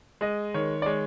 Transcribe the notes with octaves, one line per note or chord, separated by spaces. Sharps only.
G#3 D#5
D#3 C#5
D5
G#3 C#5